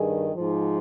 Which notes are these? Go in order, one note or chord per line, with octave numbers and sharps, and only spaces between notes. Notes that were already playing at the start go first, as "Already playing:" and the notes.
Already playing: G2 D#3 G#4
G#2 F3